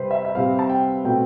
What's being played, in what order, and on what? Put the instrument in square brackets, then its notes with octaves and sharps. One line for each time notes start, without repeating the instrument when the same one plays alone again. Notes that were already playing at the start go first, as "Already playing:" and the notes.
Already playing: [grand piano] C3 G3 C4 B4 C5
E5
E5
C3 G3 C4 F5
A5
G5
B2 A3 C4 G5